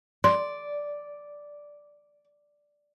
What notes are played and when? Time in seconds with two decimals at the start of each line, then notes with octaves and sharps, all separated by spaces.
0.24 D5 C6